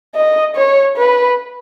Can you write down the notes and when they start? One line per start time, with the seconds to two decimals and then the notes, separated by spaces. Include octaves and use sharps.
0.15 D#5
0.56 C#5
0.97 B4